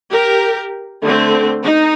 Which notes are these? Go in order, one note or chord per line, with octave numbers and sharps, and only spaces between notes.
G4 A#4
D3 A3 C4
D#4